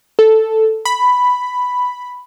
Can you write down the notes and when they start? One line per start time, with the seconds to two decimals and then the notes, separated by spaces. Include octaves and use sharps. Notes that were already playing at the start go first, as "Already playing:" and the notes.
0.19 A4
0.85 B5